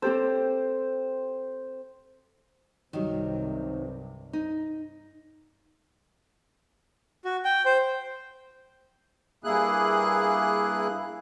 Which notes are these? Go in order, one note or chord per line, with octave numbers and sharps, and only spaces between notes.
C4 G4 A4 C5
C2 G2 C3 D#3 F#3 G3
D#4
F#4
G5
C5
G2 A#3 E4 G#4 F#6